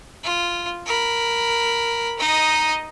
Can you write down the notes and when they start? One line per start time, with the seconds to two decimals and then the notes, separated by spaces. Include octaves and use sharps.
0.24 F4
0.86 A#4 B5
2.19 D#4 D#5